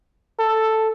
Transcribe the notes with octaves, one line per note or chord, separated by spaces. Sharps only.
A4